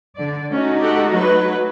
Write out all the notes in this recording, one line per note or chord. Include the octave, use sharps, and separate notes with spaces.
D3 D5
A3 C#4 D#4 F#4
G4 A4 F#5
F#3 B4